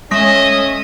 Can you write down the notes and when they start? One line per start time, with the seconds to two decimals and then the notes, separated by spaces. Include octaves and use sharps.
0.11 G#3 A3 C#4 D#5 E5 D#6 A#6